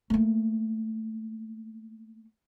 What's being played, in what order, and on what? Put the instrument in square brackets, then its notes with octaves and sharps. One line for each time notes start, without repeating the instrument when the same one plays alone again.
[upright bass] A3 A#3